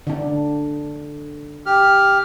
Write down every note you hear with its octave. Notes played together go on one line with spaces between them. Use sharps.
D3 D4
G4 F6